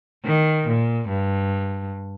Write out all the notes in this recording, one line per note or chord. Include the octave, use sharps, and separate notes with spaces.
D#3
A#2
G2